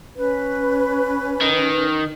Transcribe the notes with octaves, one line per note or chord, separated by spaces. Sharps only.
C#4 B4
D#3